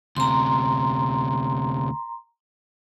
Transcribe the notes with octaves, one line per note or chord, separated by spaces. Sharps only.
D2 C3 A#5 C6